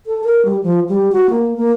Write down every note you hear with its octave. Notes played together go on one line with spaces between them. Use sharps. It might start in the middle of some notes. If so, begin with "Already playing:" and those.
A4
A#4
G3
F3
G3
F#4
A#3
A#3